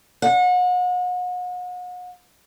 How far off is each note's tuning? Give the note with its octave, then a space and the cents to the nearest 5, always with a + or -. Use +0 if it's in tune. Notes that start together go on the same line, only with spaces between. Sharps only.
F#5 -40